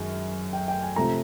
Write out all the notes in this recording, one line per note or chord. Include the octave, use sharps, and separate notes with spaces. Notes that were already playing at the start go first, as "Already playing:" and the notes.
Already playing: F#2 D#3 G#3
G5
G5
G#5
C3 F3 A3 A#5